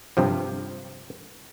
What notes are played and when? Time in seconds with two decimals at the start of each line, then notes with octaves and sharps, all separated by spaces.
0.17 G2 C3 F3